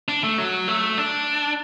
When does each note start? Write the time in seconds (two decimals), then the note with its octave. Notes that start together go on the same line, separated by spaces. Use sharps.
0.08 D4
0.24 A3
0.38 F#3
0.68 A3
0.98 D4